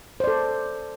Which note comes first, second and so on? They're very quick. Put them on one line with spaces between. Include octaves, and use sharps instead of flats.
C5 D5 A4